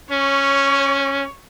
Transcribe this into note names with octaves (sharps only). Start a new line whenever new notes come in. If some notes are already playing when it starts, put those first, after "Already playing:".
C#4 C#5